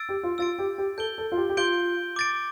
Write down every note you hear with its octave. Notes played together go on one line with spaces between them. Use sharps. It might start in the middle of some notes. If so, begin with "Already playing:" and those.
Already playing: E6 A6 D7
G4
F4
F4 E6 A6 D7
G4
G4
A4 G6 D7 G7
A4
F4
G4
G4
F4 G6 D7 G7
D6 A6 D7